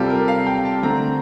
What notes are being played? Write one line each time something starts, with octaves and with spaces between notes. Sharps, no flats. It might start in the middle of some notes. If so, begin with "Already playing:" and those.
Already playing: C3 G3 C4 F4 G4 A4
A#4
F5
G5
A5
D3 A3 C4 A#5